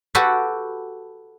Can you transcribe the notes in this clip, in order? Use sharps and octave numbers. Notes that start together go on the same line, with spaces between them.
F#4 G4 A4 B4